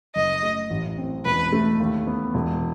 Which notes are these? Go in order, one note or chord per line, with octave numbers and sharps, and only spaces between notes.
F#1 D#5
A3
A1
C4
E1 B4
A3
D#2
B3
E1